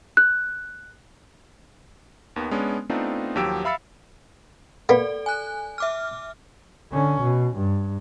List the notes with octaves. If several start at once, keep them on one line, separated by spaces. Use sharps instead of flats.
F#6
D#2 D#3 B3
G#3 B3 C#4 D4
A3 B3 C4 D4 D#4 F4
D#2 F3 F#3 G4 E6 D7
E5 F5 B5 E6 A6 C#7
A#3 B3 A4 D5
G#5 F#6
E5 D6 F6
D3 C#4
B2
G2